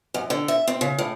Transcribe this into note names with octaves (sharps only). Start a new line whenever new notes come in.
F#2
D3
E5
C4
C#3
A2